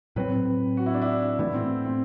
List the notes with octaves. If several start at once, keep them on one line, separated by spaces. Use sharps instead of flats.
A2 F#3 C4 B4
F#4
E4
D4
E4
A2 E3 A3 E4
C4
C4